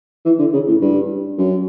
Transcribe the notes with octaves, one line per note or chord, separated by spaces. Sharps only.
E3
D3
C#3
A2
G2
F#2